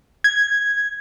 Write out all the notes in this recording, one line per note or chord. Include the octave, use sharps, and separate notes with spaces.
G#6